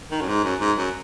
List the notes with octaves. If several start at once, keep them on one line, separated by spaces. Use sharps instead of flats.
D#3
F#2
G#2
F#2
G#2
F#2